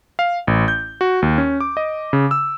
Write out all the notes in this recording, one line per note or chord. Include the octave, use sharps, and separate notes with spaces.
F5
A1
G6
F#4
D#2
C#4
D6
D#5
C#3
E6